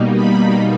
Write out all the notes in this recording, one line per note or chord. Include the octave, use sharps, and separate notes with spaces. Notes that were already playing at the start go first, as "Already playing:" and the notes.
Already playing: B2 G3 A#3 D#4
B5